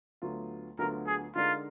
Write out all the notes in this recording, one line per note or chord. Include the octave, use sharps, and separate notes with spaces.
D2 D3 F#3 B3 F4
D2 D3 F#3 B3 F4 A#4
G#4
D3 G#3 D#4 F4 A#4 D5